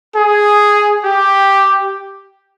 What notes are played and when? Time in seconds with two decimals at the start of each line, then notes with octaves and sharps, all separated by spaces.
0.14 G#4
1.03 G4